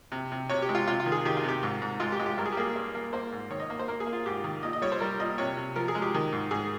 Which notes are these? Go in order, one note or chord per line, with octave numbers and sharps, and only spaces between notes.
C3
C3
C3 C#5
G4
G#3
F4
C3 F4
F4
D#3
G#4
D#3 G4
F4
C3
G4
G#2
G#2
G#3 F4
G4
G#3
G4
G2 A#4
G#4
G4
A#3 G#4
G2
A#3
A#3 C5
G#2
D#3 C#5
D#5
A#3
C5
A#3 A#4
G#4
A#3
F4
G#2 G4
D#3
A#2 D#5
D#5
G3 C#5
C5
G3 A#4
A#2 D#5
C3 C#5
C3
F3 A#4
G#4
G#3
G4
D#3
G#2
G#2 G#4